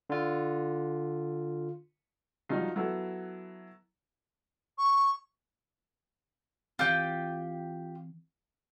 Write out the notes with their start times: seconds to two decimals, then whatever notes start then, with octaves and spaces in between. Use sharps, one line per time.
0.10 D3 F4
2.49 G2 F3 F#3 D#4 F4
2.76 F#3 B3 E4 A4
4.78 C#6
6.79 E3 C4 F4 G4 G5